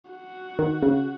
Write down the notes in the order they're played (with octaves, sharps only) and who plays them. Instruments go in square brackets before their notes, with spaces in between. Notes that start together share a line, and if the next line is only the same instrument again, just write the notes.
[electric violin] F#4
[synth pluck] D#3
C#3